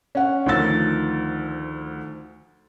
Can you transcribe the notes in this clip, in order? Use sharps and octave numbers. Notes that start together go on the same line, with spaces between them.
C#4 F#5
D2 D#3 F3 E6 A6